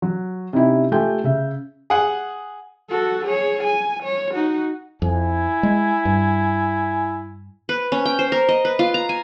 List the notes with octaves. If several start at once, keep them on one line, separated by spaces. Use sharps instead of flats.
F#3
C3 C#4 D#4 E4 G4
A3 F4 G4 G5 G#5 G6
C#3 E5
G#4 F#5
F#4 A4
G#4 C#5
G#5
C#5
D#4 F#4
F2 E4 G#5
G#3
G2
B4
C#4
G5
C5
A#4
D#5
B4
F4
A#5
G#5